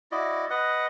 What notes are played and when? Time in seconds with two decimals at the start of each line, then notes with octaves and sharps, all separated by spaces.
0.12 E4 F#4 D5 D#5
0.50 B4 D#5 F#5